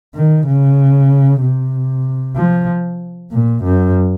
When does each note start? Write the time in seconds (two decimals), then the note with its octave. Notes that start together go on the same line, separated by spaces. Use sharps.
0.14 D#3
0.46 C#3
1.42 C3
2.36 F3
3.31 A#2
3.64 F#2